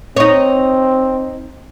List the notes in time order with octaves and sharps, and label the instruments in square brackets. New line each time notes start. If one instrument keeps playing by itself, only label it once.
[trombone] C4 [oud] D#4 C#5